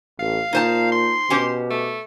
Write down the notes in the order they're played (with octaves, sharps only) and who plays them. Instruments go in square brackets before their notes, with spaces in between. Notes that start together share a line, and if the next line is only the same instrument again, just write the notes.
[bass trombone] A1 [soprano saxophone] F5
[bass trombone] A#2 [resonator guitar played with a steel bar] D#4 C5 A5
[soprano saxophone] C6
[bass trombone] B2 [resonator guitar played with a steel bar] C#4 G4 C5
[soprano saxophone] A3